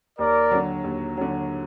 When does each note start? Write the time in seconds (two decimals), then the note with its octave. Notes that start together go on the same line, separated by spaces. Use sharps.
0.19 D#2 A#4 D5
0.51 D3 F#3
0.84 D#2
1.17 D3 F#3